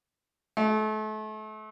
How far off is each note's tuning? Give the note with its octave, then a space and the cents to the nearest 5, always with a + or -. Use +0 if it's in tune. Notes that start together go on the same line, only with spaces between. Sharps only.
A3 -35